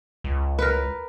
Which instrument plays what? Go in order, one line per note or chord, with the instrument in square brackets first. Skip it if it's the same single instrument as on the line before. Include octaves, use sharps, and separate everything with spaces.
[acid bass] C#2
[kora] A#4 B4